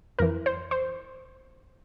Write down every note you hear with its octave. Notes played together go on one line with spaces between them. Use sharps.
F2 E3 A#4
C5
C5